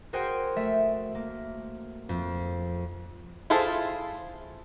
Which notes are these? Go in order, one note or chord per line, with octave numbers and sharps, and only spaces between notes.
F#4 G#4 A#4 C5 G5
A3 E5
A#3
F2
E4 F4 G#4 A4 C5